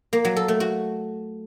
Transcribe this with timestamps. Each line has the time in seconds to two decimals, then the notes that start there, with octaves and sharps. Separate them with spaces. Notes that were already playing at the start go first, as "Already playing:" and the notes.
0.13 A#3
0.25 F#3
0.36 A4
0.48 A3
0.60 F#4